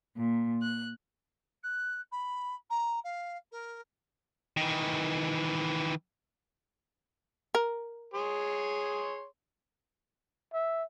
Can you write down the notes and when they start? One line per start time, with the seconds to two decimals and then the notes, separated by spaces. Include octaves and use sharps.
0.16 A#2
0.62 F#6
1.63 F#6
2.12 B5
2.70 A#5
3.04 F5
3.51 A#4
4.57 D#3 E3
7.55 A#4
8.14 G#4 C#5 C6
10.53 E5